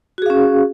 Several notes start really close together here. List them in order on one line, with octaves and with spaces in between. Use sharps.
F#4 G#4 F5 C#4